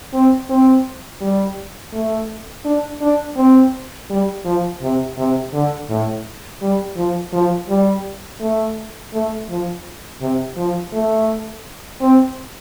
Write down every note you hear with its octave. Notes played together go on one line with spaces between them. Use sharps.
C4
C4
G3
A3
D4
D4
C4
G3
F3
C3
C3
D3
A2
G3
F3
F3
G3
A3
A3
F3
C3
F3
A3
C4